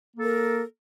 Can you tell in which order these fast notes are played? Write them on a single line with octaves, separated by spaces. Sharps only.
A#3 A4 A#4